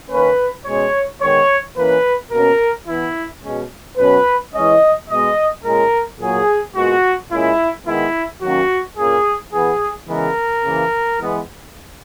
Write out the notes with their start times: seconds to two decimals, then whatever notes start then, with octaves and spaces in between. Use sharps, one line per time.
0.10 D#3 A#3 C#4 B4
0.66 B2 G#3 C#4 C#5
1.21 D#3 G#3 B3 C#5
1.77 E3 A#3 C#4 B4
2.31 B2 A#3 C#4 A#4
2.87 E3 B3 E4
3.43 B2 G#3 C#4
3.98 B2 F#3 C#4 B4
4.54 E3 G#3 C#4 D#5
5.09 B2 G#3 B3 D#5
5.64 A#2 G#3 C#4 A#4
6.20 A#2 F#3 A#3 G#4
6.75 A#2 G#3 B3 F#4
7.31 A#2 G#3 C#4 E4
7.86 D#3 G#3 B3 E4
8.42 D#3 F#3 A#3 C#4 F#4
8.97 A#2 A#3 C#4 G#4
9.52 E3 B3 G#4
10.08 C#3 E3 G#3 B3 A#4
10.64 C#3 E3 A#3
11.20 E3 G#3 B3